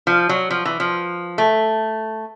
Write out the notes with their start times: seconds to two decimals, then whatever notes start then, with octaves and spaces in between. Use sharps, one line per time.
0.07 F3
0.29 F#3
0.51 F3
0.65 E3
0.80 F3
1.38 A3